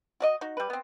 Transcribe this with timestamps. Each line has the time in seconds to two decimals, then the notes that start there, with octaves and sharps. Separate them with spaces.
0.20 F#4 D5 D#5
0.41 D#4 F#4
0.57 G3 B4
0.70 B3 C4